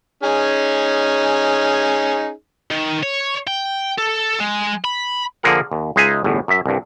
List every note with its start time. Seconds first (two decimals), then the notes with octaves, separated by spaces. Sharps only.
0.23 C#4 D#4 G#4
2.71 D#3
3.03 C#5
3.47 G5
3.98 A4
4.40 G#3
4.85 B5
5.43 D3 F3 A#3 G#4 A#4 F#5
5.72 D#2
5.96 C#2 G#3 D#4 G#4 E5 G#5
6.24 G1 E2 A2
6.48 F#2 E5
6.66 C2 G2